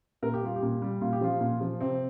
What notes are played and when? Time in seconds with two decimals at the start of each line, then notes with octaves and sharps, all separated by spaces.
0.22 A#2 A#4
0.34 G4
0.42 G3 F4
0.56 G4
0.63 A#2
0.82 G3
1.01 A#2 F4
1.13 G4
1.21 F3 F4
1.41 A#2
1.61 F3
1.81 C3 C4